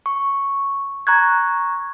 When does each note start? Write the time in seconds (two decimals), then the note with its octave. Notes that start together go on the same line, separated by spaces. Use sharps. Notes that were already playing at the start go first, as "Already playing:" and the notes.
0.06 C#6
1.07 A#5 C#6 F#6 G#6